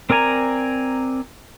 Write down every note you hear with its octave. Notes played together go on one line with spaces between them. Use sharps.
C4 A#4 D5 G#5 A#5